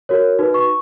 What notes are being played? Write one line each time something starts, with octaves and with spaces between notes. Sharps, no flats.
F#4 A#4 C#5
D#4 F#4 B4
C#6